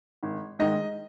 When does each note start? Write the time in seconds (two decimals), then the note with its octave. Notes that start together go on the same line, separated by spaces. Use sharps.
0.23 G#1
0.59 G#2 D#3 D#5